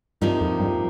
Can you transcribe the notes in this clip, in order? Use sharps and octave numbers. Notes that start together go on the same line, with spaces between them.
G2 C3 F3 A#3 D#4
F2
G2